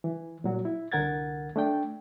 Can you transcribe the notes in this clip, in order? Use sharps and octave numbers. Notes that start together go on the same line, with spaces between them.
E3
A#2 F#3 F#4
E4
C2 D3 A#4 F#5 G#6 A6
A3 D4 G5